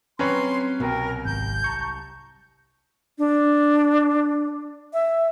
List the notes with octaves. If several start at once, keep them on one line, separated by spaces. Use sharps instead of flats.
F#3 G3 C4 C#4 B4 C#5 A#5 C6
C2 B2 A#4 G5
G#1 G6
A5 A#5 C#6
D4
E5